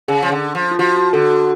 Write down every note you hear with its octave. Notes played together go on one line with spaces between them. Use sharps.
C#3 G#4
F3
D3
F3
F4
F3 F#4
F#4
D3 F#4 A4
F#4